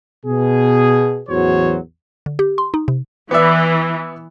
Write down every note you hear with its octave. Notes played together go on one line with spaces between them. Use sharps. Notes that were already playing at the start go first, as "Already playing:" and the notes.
B2 G#4
A1 E2 F#3 F#4 C5 C#5
D3
G4
C6
D#4
C3
E3 B3 D5 E5